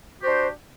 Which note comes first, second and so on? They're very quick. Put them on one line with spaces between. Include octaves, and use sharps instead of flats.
F#4 G4 C5 D4